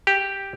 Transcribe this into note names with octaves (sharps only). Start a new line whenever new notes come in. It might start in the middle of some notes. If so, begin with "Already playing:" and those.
G4